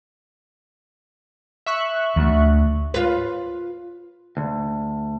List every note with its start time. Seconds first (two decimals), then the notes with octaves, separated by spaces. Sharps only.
1.66 E5 C#6 F#6
2.16 D2
2.94 F4 B4
4.37 D2